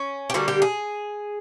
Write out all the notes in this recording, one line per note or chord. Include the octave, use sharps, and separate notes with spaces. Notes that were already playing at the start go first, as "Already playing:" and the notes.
Already playing: C#4
G4
D3 G3 A#3 F#4
G4
G#4